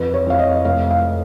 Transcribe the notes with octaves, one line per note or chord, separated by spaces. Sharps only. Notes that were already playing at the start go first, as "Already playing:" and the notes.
Already playing: F2 B4
C#5
F2 F5
D#5
F1 F5
F5